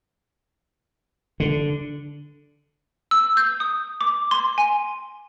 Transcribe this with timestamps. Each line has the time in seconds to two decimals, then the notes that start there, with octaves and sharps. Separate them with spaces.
1.40 D3
3.11 E6
3.37 G6
3.60 D#6
4.01 D6
4.31 C6
4.58 G#5